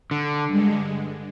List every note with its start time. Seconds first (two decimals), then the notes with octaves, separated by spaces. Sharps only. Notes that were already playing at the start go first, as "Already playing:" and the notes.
0.11 D3
0.48 G2 D3 G#3